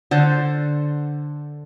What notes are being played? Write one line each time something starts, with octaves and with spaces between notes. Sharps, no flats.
D3 A4 C5